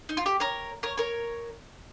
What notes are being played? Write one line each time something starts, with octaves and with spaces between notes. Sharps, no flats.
D#4
F4
G4
A#4 C#5
A#4 C#5
A#4 C#5